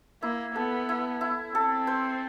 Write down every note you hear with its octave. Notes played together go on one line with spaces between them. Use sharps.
A#3 E4
B3 A4
E4
E4
C4 A4
C5